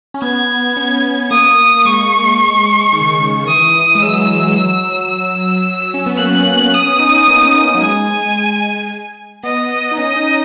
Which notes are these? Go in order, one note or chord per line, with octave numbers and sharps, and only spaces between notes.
C#4
B3 G#6
C#4
A#3 D#6
G#3 C#6
D#3
C#3
D#3
D#3
E3 D#6
G#3
F#3 E6
E6
E6
C#4
B3
A#3 F#6
B3
C#4
C#4
B3 D#6
C#4
D#4
C#4
A#3
F#3
G#3 G#5
B3 D#5
D#4
C#4 D#5
D#4